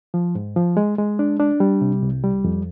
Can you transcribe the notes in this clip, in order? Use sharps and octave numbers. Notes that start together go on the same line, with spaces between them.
F3
G#2
F3
G#3
G#3
D4
D4
G3
C3
C2
G3
F2